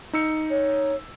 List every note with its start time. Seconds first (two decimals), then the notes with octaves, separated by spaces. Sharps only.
0.13 D#4 E6 C#7
0.50 C#5